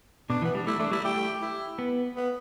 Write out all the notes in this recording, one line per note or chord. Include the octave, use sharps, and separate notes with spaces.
B2 D4
E3
B3
G3 D4
A3 E4
A3 D4
G3 E4
A3 G4
E4
B3
B3